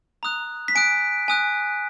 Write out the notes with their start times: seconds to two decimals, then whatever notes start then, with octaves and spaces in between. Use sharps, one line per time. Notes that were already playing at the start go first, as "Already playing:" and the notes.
0.23 A#5 D#6 F#6
0.68 B6
0.75 G#5 D#6 F#6 D7
1.28 G#5 D#6 F#6